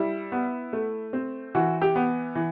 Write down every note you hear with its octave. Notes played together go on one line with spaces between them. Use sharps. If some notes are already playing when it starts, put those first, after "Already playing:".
Already playing: G3 E4
B3
A3
C4
E3 F#4
G4
B3
E3